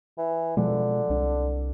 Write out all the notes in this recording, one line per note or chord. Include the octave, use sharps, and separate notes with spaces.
E3
B2 D3 F3 G#3
C2 D4